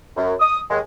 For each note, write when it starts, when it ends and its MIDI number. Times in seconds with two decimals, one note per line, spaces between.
0.16 0.33 42
0.40 0.60 87
0.70 0.79 39
0.70 0.79 56